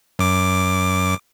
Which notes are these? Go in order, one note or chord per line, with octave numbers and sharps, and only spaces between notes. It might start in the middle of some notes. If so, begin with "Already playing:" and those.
F#2 D6